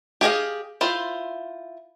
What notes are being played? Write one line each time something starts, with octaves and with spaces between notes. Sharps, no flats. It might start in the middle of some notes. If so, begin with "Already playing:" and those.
G4 G#4 D#5 F5
E4 F4 C5